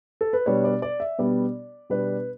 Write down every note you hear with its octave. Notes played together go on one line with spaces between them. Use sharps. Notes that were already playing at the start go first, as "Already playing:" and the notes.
A4
B4
B2 G3 B3 D4 C#5
D5
D5
E5
B2 G3 B3 D4 D5
B2 G3 B3 D4 B4